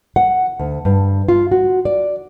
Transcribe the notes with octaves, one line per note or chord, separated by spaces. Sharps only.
F#5
D2
G2
F4
F#4
D5